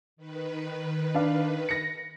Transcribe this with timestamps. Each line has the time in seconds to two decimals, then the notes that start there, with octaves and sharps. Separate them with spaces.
0.17 D#3 B4
1.14 D4 F5
1.69 A#6 C#7